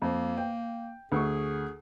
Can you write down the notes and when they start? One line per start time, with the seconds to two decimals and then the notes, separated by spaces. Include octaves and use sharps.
0.02 F2 A#3
0.37 G5
1.12 D2 G#4 C#6